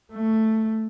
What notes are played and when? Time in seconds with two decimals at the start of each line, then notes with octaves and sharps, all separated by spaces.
0.12 A3